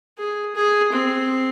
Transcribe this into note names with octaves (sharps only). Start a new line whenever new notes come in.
G#4
G#4
C4